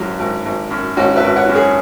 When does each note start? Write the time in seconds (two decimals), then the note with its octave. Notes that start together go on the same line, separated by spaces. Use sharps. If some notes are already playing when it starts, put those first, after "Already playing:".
Already playing: G#1 F#2 F#3
0.19 G#1
0.45 G#1
0.71 F#2
0.97 G#1 C#4 F#4
1.16 B4 E5
1.23 G#1
1.36 C#5 F#5
1.49 F#2
1.55 G#4 C#5